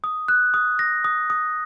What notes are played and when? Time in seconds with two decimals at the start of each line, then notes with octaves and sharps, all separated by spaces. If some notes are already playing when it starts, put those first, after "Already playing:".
0.04 D#6
0.28 F#6
0.54 D#6
0.79 A#6
1.04 D#6
1.30 D#6